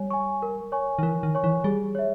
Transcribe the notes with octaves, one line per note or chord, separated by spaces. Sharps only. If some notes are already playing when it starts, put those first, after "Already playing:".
Already playing: G3 C#5 G#5
G#5 C#6
A#4
C#5 G#5 C#6
D#3
E3 A#4
D#3
C#5 G#5 C#6
E3
G3 G#4
C#5 E5